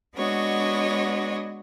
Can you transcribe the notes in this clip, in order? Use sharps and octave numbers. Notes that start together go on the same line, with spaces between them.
G#3 B3 D4 F#4 C#5 D#5